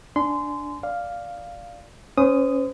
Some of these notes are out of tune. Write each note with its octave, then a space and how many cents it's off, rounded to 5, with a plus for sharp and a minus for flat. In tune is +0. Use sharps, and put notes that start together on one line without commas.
D4 +0 G#5 +20 C6 -20
D5 +0 F5 +0
C#4 +0 C5 -40 D#6 +0